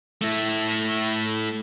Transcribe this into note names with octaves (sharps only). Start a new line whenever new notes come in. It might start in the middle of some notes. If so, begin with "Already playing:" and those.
A3 E4